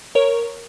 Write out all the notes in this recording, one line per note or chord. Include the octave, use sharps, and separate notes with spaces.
A#4 C#5